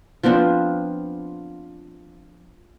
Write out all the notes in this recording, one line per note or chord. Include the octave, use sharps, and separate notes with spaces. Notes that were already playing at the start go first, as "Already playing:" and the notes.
F3 B3 C4 D4